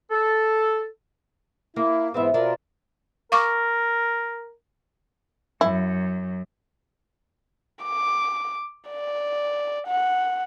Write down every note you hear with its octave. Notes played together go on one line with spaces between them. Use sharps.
A4
A#3 E4
G#2 E3 B3 C4 B4 E5
B2 D4 F4 A#4
A#4 F5 C#6 D6
F#2 E4
D6
D5
F#5